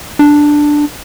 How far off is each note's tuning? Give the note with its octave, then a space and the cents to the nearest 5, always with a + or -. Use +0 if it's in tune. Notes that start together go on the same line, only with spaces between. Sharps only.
D4 +5